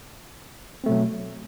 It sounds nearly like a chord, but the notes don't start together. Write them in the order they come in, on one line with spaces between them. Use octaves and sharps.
C4 A3 B2 F#3